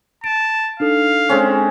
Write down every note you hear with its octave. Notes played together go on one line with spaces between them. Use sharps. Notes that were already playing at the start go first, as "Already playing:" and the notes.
A5 D7
D4 D#4 A4 F5
G#3 C4 C#4